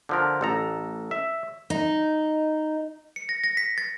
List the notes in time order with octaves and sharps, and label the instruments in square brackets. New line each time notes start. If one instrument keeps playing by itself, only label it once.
[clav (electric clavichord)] D3 F3 A#4
A1 A4 A#5
E5
[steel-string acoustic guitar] D#4
[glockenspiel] C#7
A#6
A#6
B6
A6